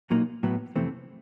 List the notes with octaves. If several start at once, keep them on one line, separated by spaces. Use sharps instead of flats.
B1 A#2 F#3 A#3 D#4
A2 F#3 B3
F2 C3 E3 A3 C4